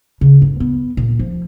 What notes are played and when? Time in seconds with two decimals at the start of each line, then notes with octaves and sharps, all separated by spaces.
0.21 C#3
0.42 G2
0.60 B3
0.97 A#2
1.19 F3